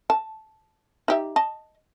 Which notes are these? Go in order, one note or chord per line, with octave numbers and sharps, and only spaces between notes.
A5
D#4 G4 E5
D#5 A5